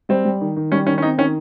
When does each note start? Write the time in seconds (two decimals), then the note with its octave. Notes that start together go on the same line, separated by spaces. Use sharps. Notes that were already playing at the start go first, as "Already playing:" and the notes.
0.09 G3 C4
0.25 G3
0.41 D#3
0.56 D#3
0.72 G3 C#4
0.87 D#3 C#4
0.98 C#4
1.02 C4 D#4
1.18 D#3 C#4